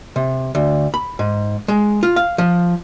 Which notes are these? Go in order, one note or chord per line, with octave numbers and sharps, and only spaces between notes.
C3
D2
B5
G#2
G#3
F4
F5
F3